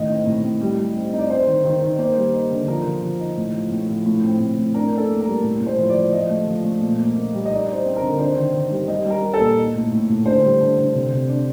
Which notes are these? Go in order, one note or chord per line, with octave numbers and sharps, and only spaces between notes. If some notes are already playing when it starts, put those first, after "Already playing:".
Already playing: A2 D#3 D#5
C4
A2
A2
G3
G3
C4
D#4
D5
D#4 C5
D#3
D#3
D#3
A#3 C5
G3
D#4
D3
F3 A#4
F3
F3
D#4
A2
F3
A2
F3
A2
C4
A2
A2
D4 A#4
D4
A4
A#3
A#4
G3
A2
A2
C5
F3
D5
F3
F3 D#5
A3
F3
A3
A#2
A#3
A#3
G3
D#5
D#4 D5
D#4
C5
C4
D3 A#4
D4 C5
D#3
D#3
G3
G3 D#5
G3
A#4
G3
A4
A#2
D#4
A2
A2
A2
D3 C5
G3
D3
D3
C3
C3
D4